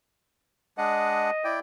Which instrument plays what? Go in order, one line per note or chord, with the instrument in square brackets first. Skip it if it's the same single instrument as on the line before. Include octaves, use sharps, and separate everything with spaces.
[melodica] G#3 D4 F#5 [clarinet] D#5
[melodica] E4 D5 G5